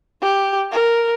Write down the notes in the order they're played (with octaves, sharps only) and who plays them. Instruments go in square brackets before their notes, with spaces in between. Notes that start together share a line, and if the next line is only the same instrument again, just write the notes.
[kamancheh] G4
A#4